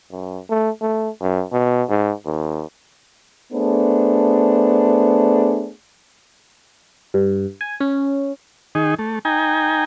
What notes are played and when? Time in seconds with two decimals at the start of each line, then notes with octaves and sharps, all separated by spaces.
0.11 F#2
0.50 A3
0.81 A3
1.21 F#2
1.52 B2
1.89 G#2
2.25 D#2
3.53 A3 B3 D4 G#4 C5
7.14 G2
7.61 G#5
7.80 C#4
8.75 D#3 D#4 G#4
8.99 A3
9.25 D#4 G5 G#5 A#5